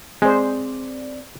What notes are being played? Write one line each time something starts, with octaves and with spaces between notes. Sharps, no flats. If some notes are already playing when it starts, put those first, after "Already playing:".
G#3 C4 G#4 C5 D5